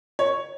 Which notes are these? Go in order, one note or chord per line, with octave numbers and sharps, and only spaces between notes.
C#5